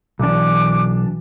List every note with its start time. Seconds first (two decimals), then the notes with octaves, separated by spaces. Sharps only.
0.20 B1 B2 E3 D4 D6